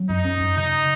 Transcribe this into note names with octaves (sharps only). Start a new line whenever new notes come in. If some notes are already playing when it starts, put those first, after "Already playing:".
Already playing: F#3
F#2 D#4
C#4
F#2
C#3 D#4